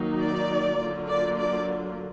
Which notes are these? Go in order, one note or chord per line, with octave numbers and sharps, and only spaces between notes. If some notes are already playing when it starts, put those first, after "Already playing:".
Already playing: D#3 F#3 A#3 D#4
D5
D3 F#3 A#3 F4
D5
D5